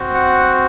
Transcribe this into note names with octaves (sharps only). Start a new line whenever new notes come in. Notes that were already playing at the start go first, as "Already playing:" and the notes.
Already playing: C4 F#4
F#5